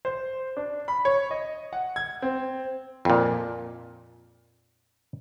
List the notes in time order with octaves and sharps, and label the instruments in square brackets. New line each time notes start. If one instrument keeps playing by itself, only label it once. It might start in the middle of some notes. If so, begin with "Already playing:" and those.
[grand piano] C5
D4
B5
C#5
D#5
F#5
G#6
C4
[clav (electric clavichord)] F2 A#2